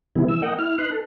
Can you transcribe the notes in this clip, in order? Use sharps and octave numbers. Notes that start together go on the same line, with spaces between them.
C3 D#3 E3 G3 B3 E4
E3 E6
A#3 D#5 F#5 G5
E4 F6
D#4 B4 C6 F#6
A4